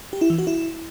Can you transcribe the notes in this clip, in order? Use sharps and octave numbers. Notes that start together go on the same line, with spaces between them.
G4
E4
E3
F#4
E4